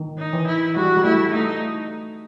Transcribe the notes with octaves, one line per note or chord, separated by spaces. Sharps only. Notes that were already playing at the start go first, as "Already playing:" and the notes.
Already playing: D#3
D#4
E3
E4
G3 F#4
G3
A3 E4
A3 D#4